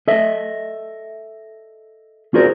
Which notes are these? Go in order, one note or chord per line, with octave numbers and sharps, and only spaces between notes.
A4 D#5 E5
F4 F#4 G#4 A#4 C5 D5